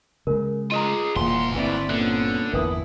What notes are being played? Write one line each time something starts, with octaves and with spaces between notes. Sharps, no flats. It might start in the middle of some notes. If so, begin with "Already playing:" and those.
C#3 G#3 A#4
F4 G#4 D#5 A#5
D#1 D2 A#2 E3 C6
G1 C#3 C4 E4 B4 D5
A#2 D3 B3 C#4
G1 E2 E4 A#4 B4 D#6